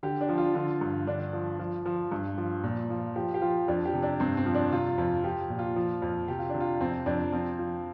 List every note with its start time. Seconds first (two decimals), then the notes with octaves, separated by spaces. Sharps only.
0.03 D3 G4
0.21 D4
0.29 F3
0.38 F4
0.55 D3 F4
0.81 G2
1.07 D3 D4
1.33 F3
1.59 F3
1.85 F3
2.11 G2
2.38 F3
2.64 A#2
2.90 F3
3.16 F3 G4
3.34 G4
3.42 F3 F4
3.68 F2 D4
3.85 G4
3.94 C3
4.03 D4
4.20 G2 C4
4.37 C4
4.46 F3
4.55 D4
4.72 C3 F4
4.98 F2
5.24 F3 G4
5.50 A#2
5.59 F4
5.76 F3
6.02 F2
6.28 C3 G4
6.39 F4
6.49 D4
6.54 C3
6.60 F4
6.81 F2 C4
7.06 F2 D4
7.32 F3 C4
7.59 F3